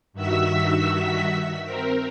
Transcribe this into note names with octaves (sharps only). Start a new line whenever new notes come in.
G2 D#3 F#4 E5 E6 B6
C4 A#4